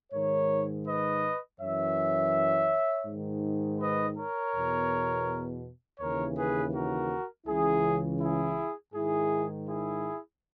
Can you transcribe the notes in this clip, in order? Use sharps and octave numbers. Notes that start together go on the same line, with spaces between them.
G#2 D#3 A#4 C#5
B4 D#5
F#2 E3 C#5 E5
G#2 D#3
B4 D#5
A#4 C#5
E2 B2
D#2 C#3 E3 A#4 C#5
G#4 B4
F#4 A#4
C#2 C#3 E3 E4 G#4
E4 G#4
G#2 D#3 E4 G#4
E4 G#4